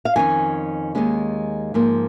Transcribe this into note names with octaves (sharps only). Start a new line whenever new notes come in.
F5
F2 D#3 C#4 G#5
D#2 D#3 G#3 C#4
G#2 F3 A#3